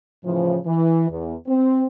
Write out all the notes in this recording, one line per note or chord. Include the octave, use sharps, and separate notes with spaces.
A2 C#3 E3 F3
E3
E2
C4